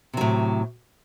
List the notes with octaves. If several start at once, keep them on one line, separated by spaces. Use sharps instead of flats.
A2 C3 F#3